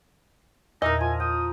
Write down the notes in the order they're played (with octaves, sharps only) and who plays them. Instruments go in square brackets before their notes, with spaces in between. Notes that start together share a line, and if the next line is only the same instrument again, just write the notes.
[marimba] E2 A#2 [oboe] D#4 [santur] A#4 E5 [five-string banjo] D#5
[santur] F3 [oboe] G#5
[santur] G5 [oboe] D#6